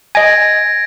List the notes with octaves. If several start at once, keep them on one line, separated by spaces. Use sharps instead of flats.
D#5 G#5 G#6 A#6 D7